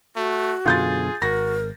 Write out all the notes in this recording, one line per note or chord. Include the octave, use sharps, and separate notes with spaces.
A3 F#4
F#2 B2 D3 F4 G#4 G6 A6
G#1 F#4 A#4 A#6